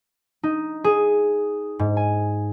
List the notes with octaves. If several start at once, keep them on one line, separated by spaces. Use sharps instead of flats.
D#4
G#4
G#2
G#5